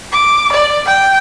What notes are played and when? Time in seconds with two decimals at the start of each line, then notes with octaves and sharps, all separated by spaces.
0.12 D6
0.53 D5
0.86 G5